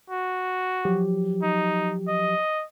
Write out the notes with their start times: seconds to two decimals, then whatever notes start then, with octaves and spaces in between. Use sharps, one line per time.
0.10 F#4
0.85 F3 F#3 G4
1.42 D#4
2.08 D#5